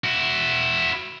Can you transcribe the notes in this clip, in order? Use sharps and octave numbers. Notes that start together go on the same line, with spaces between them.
E4 F#4